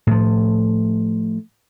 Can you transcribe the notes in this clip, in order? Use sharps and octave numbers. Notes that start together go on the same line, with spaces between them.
A2 F3